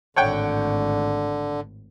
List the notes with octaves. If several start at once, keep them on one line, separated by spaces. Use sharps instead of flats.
G#1 A2 D3 C#5 F#5 G5